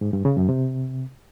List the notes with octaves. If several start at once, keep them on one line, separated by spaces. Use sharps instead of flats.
G#2
G2
C#3
F#2
C3